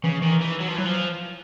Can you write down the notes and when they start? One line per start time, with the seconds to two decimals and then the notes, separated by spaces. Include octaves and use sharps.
0.04 C#3 E3
0.22 D#3 E3
0.41 E3
0.60 F#3
0.68 F3
0.76 E3 F#3
0.85 F3